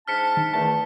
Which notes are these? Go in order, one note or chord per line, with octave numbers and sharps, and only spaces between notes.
G#2 D4 A5 F6 B6 C#7
D#3
E2 D#3 A3 A5